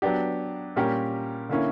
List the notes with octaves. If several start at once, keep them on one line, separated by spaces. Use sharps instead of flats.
F#3 B3 D4 G4
A#2 G3 C#4 G4 A#4
D3 A#3 C#4 E4